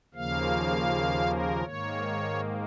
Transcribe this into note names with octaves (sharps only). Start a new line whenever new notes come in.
D#2 C#3 F3 A#3 F5
A#4
G#2 D#3 A#3 C#5